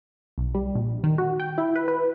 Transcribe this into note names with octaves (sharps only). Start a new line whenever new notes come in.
B1
G3
A#1
D#3
F#4
G5
E4
B4
B4